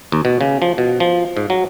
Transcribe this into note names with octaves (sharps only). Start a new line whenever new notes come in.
D#2
B2
C#3
F3
B2
F3
G#2
F#3